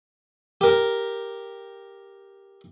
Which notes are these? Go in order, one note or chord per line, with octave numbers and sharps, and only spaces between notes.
G4 A#4